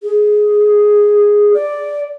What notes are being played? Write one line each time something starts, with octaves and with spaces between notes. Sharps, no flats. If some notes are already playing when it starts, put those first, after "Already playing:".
G#4
D5